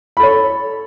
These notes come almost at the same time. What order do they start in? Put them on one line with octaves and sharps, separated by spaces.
B5 A4 C#5